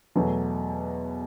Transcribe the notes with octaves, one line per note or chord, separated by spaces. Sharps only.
E2 B2 F#3 A3